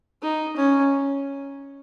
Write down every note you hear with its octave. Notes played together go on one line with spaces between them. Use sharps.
D#4
C#4